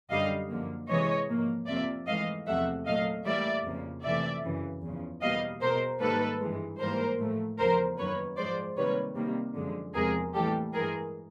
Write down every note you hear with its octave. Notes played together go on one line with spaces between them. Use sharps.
F#2 D3 G3 D#5 F5
F#2 D3 F3 A#3
C3 E3 G#3 C#5 D#5
G#2 F3 A#3
F2 C3 F3 A#3 D5 E5
G#2 E3 A3 D#5 F5
E2 C3 F3 A3 E5 F#5
A#2 F#3 A3 D#5 F5
A2 E3 G3 A#3 D5 E5
F2 C#3 F3 A#3
F2 C3 E3 A3 D5 E5
F#2 C#3 E3
E2 C#3 F3
E2 B2 G3 A#3 D#5 F5
B2 G#3 A#4 C5
G#2 D#3 G3 A#3 A4 B4
G2 E3 G#3
G#2 E3 G3 A#3 A#4 C5
A2 F3 A3
E2 C#3 F3 A#4 C5
F#2 D#3 F#3 A#3 B4 C#5
G#2 F3 G#3 C5 D5
C3 D#3 G3 A#3 B4 C#5
C3 D#3 G3 A#3
F#2 D3 F3 G#3
E2 C3 F3 G#3 G#4 A#4
A2 E3 G3 A#3 G4 A4
G2 E3 G#3 G#4 A#4